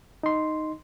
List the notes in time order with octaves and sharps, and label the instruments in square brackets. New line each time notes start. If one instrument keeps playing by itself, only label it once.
[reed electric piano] D#4 C6